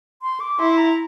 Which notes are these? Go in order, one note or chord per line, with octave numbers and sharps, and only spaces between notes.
C6
D6
E4 C6
A#5